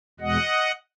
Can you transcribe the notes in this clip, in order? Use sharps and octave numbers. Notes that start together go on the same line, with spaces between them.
E2 B2 G#3 D#5 F#5